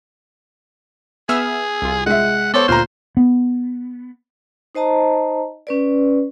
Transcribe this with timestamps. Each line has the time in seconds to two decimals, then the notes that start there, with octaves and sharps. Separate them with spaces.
1.29 B3 G#4 E5 E6 F6
1.82 C2 F4
2.06 G#3 E5 F#5
2.54 B3 A4 C5 C#5 D6
2.68 D2 A#2 F4 C5 A#5
3.17 B3
4.75 D#4 C5 D#5 A5 A#5
5.67 C#4 B4 D5